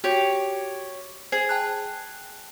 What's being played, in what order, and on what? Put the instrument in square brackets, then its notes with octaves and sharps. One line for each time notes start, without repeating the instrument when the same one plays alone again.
[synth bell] F#4 [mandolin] G4 C#5
[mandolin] G#4 [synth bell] C5
[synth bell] G5 A5 F#6